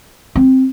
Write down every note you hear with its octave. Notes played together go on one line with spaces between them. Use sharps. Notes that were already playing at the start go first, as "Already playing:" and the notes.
C4